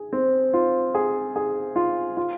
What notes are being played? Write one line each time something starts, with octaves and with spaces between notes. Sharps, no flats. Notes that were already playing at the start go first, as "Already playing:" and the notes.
Already playing: G#4
C4
F4
G#4
G#4
F4
F4